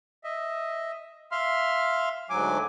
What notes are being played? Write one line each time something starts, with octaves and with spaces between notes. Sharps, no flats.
D#5 E5
E5 F5 C6 F6
D2 G#2 F#3 G#5 D6